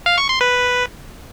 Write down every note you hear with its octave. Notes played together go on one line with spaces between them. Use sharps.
F5
C#6
C6
B4